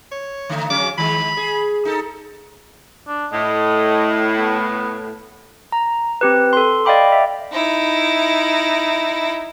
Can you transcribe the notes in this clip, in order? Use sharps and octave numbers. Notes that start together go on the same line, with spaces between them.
C#5
D3 A3 D#4
F#3 G#3 C#4 D6
D#3 G#3 B5
G#4
D#4 A4
D4
A2 D#5
B3
A#5
C4 G4 B4
A4 C6
D5 D#5 F5 G5 B5 D6
E5
D#4 E4